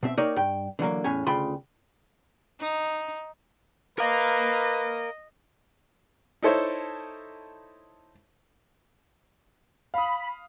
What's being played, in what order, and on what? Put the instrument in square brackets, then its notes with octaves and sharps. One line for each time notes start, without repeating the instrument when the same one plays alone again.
[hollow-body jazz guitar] B2 C4 E5
A#3 D#4 G4 A#4 C#5 D5
G2 G5
D3 E3 F#3 A#3
E2 A2 C#4 G#5
D2 C#3 F4 G5 B5 C6
[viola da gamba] D#4
[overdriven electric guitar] A#4 F5 [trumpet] B4 [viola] D#5
[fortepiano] D#4 E4 A4 C5 C#5
[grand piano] F5 D#6 [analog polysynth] B5